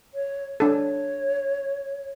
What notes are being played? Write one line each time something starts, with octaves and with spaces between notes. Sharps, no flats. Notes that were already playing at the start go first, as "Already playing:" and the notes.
C#5
D4 A4 C#5